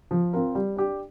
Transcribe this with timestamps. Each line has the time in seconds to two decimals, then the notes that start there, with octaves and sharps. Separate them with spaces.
0.11 F3
0.33 C4 F4 A#4
0.55 G3
0.76 D4 G4